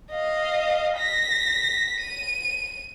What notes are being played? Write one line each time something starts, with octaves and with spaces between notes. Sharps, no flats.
D#5 F5
A#6 B6
D#7